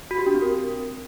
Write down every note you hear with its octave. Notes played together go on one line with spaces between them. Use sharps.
F#4
G4
D4
C4
A#4